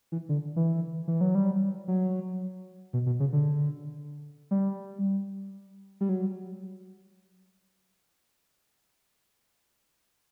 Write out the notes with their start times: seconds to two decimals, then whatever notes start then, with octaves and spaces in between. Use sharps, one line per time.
0.12 E3
0.29 D3
0.56 E3
1.08 E3
1.21 F#3
1.35 G3
1.88 F#3
2.93 B2
3.06 B2
3.20 C#3
3.33 D3
4.51 G3
6.01 G3
6.09 F#3